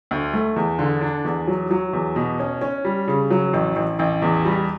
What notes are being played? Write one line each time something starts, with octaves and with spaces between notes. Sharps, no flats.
D2
A3
E2
D3
D4
E2
F#3
F#3
E2
B2
C#4
C#4
G3
C#3
F#3
A1
A1
A1
E2
G3